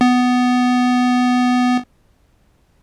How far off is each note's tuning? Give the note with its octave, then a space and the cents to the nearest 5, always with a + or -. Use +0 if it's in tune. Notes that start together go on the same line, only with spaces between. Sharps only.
B3 +10